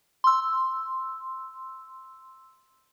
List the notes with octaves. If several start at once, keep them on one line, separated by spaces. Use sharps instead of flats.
C6 E6